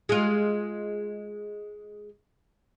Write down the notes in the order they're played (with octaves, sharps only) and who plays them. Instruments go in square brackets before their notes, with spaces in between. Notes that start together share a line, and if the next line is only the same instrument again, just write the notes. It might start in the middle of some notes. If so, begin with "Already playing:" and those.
[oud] G#3 F4